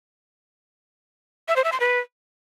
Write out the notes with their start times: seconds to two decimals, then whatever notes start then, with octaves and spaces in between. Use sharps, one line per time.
1.48 E5
1.56 C5
1.64 E5
1.72 C6
1.80 B4